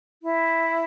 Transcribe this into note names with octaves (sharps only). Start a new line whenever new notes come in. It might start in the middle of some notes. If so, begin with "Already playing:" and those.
E4